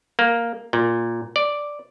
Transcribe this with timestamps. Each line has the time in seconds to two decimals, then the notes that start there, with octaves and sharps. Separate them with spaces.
0.19 A#3
0.73 A#2
1.36 D5